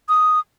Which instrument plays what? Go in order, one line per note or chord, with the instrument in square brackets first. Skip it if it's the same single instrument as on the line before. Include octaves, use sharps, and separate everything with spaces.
[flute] D#6